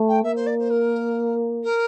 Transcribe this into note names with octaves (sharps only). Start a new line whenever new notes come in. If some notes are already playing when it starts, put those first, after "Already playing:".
Already playing: A3
G5
A#3 E5
C5
D5
C5
A#4
A#4